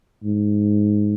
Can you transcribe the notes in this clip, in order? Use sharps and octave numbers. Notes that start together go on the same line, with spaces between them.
G#2